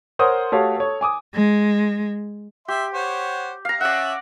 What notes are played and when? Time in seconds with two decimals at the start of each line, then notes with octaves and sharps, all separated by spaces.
0.19 A#4 C5 C#5 F#5 D#6
0.52 A3 F#4 G4 A4 C#5 F5
0.76 A4 C#5
1.01 G#5 D6 D#6
1.34 G#3
2.68 G4 E5 C6
2.94 C5 C#5 F#5
3.65 F5 A#5
3.81 C#4 D5 E5 F#5